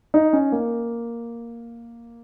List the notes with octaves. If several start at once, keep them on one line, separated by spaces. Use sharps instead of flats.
D#4
C#4
A#3